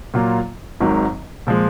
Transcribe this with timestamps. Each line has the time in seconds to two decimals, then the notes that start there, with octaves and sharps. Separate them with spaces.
0.14 A#2 F#3 A#3 F4
0.80 G#1 G#2 D#3 F#3
1.47 A#2 F3 G#3